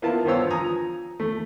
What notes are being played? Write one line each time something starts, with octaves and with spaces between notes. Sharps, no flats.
A#3 B3 E4 F4 A#4 A5
G2 B3 F4 C5 C#5 E6
F3 G#5 A#5 D#6
A3